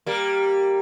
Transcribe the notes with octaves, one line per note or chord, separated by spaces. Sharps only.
G3 A#3